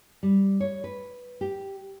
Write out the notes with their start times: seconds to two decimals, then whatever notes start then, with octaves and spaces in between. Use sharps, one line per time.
0.23 G3
0.60 C#5
0.84 B4
1.41 G4